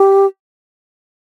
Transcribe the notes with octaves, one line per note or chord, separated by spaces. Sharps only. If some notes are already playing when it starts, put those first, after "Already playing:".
Already playing: G4